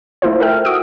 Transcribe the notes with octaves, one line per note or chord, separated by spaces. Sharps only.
A3 E4 F4 C5
A4 A#4 E5 G5 F6
F#4 D#6 E6 D7